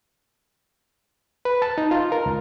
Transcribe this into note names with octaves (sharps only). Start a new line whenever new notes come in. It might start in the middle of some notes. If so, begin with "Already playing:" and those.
B4
A5
D#4
F4
A#4
C#2